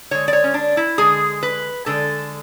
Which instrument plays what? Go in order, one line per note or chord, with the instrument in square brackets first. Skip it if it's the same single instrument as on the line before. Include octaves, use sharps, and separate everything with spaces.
[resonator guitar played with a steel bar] D3 G#3 C#5
D5
C#5
C#4
D4
E4
D3 G#3 G#4
B4
D3 G#3 A4